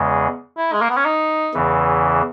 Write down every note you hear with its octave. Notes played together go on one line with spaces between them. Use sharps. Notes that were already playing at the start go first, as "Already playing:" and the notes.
Already playing: E2 C#3 G#3
E4
G#3
A#3
B3
C#4
D#4
E2 C#3 E3